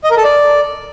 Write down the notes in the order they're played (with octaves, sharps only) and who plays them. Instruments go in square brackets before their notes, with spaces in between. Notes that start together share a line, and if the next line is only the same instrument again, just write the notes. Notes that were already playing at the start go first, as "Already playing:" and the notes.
[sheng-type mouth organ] D#5
A#4
A4
D5